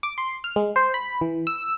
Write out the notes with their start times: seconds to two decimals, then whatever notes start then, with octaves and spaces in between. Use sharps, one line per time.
0.03 D6
0.18 C6
0.44 F6
0.56 G#3
0.76 C5
0.94 B5
1.21 E3
1.47 E6